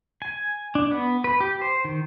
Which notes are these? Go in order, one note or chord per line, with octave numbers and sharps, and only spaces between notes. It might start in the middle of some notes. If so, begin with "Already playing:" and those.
G#5
D4
B3
B4
G4
C5
D#3